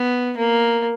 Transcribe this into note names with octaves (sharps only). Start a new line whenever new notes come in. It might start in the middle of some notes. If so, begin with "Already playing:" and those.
Already playing: B3
A#3